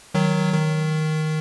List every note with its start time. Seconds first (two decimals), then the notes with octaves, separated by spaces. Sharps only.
0.14 D#3 F#3
0.53 D#3